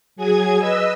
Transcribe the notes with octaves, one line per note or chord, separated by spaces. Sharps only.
F#3 G#4 G#5 G#6
B4 D#5 E6